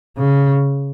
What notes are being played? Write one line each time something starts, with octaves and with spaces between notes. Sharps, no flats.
C#3